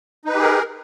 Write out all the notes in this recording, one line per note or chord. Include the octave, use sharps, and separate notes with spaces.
D#4 G4 G#4 A#4 B4